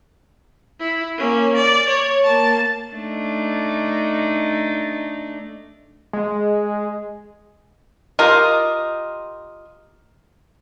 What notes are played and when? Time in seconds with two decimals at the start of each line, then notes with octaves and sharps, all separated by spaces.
0.80 E4
1.18 A#3 C#4
1.56 D5
1.88 C#5
2.24 A#3 A5
2.93 A3 D4 D#4
6.13 G#3
8.19 F4 G4 A#4 D#5